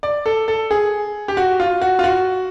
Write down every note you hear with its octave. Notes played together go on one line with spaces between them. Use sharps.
D5
A4
A4
G#4
G4
F#4
F4
F#4
F4
F#4